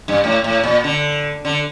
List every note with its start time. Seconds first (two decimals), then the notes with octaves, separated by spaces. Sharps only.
0.08 G2
0.24 A2
0.44 A2
0.64 A#2
0.84 D3
1.45 D3